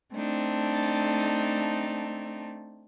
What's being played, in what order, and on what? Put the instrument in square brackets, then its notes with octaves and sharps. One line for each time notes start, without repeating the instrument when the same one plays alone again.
[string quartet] A3 C4 D4 D#4